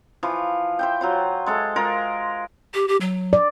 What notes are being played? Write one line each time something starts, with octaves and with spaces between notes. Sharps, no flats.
E3 F3
C5 E5 G5
F#3 F4 C5
G#3 A4 E5
G#3 F4 A#4
G4
G4
F#3
D5